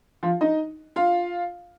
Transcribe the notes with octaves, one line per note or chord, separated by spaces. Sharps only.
F3 F4
D#4 D#5
F4 F5